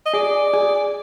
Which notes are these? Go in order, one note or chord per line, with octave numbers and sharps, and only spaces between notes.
D#5
G#4 D5
G#4